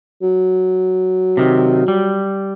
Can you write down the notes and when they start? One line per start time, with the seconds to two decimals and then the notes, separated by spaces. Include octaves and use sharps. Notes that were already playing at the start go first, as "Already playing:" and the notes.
0.22 F#3
1.37 C3 D#3
1.88 G3